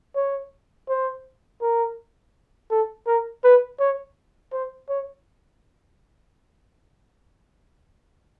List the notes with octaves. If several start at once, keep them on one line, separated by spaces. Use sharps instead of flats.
C#5
C5
A#4
A4
A#4
B4
C#5
C5
C#5